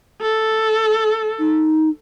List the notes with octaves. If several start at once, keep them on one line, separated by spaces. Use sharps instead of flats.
A4
D#4